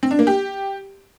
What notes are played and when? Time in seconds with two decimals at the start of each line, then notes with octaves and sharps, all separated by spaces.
0.03 C4
0.11 D4
0.19 A#3
0.27 G4